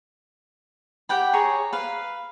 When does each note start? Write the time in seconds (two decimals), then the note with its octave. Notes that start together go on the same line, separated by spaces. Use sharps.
1.09 G4 F#5 G5 B5
1.33 G#4 C#5 A#5
1.73 B4 F5